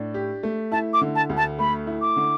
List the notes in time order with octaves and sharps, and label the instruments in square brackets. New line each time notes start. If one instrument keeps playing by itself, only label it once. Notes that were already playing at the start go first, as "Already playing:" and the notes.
Already playing: [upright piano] A2 D4
G4
A3
[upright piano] E4 [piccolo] A5
[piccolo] D6
[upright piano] D3
[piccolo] A5
[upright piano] D2
[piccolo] A5
[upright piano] A3 [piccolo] B5
[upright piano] E4
[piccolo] D6
[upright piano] D3